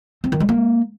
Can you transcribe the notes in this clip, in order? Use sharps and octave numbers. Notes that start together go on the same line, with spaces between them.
C4
D#3
G#3
A#3